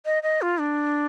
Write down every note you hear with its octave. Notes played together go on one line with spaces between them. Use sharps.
D#5
D#5
F4
D4